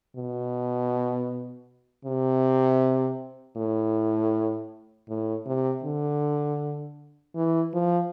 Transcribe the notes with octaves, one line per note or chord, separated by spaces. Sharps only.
B2
C3
A2
A2
C3
D3
E3
F3